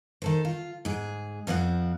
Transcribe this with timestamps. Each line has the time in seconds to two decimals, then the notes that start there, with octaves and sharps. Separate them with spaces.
0.22 D#3 A4 C5
0.45 F4
0.85 G#2 G#4
1.47 F2 F3 C4 F#5